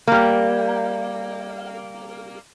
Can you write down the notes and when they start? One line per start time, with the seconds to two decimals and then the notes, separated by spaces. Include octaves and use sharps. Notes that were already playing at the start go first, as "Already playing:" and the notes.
0.08 G3 A#3